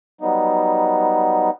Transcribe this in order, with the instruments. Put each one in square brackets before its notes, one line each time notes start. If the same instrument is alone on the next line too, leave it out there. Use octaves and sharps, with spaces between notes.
[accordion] F#3 G3 B3 D#4